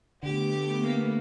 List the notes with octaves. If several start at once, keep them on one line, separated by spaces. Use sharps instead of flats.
D3 A3 B3 G4 D6
A#3